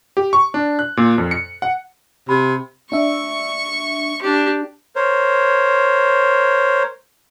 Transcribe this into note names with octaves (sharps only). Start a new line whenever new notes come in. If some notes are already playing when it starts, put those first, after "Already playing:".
G4
C#6
D4
F#6
A#2
F2
C#7
F#5
C3 B5
D4 E5 C#6
D4 G4
A#4 C5 C#5